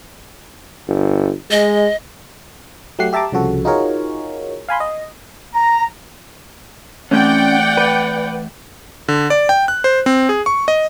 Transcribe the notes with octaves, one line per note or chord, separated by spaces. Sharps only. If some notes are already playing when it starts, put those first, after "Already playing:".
G1
G#3 D#5
F#3 A3 G4 F#5 C7
G4 E5 A5 A#5 D6
C2 C#3 F3 F#4 A4
D#4 F4 F#4 G#4 A#4 C#5
F5 G#5 B5 C6
D#5
A#5
E3 A3 C4 C#4 D5 F#5 G5
B4
D3
D5
G5
F#6
C5
C4
G#4
C#6
D#5